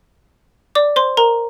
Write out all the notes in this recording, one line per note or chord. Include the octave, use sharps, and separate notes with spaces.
D5 D6
C5 C6
A#4 A#5